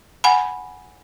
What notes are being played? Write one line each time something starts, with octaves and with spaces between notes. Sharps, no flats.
F#5 G#5 B5